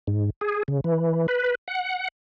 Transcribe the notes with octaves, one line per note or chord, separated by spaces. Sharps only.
G#2
G#4
C#3
E3
B4
F#5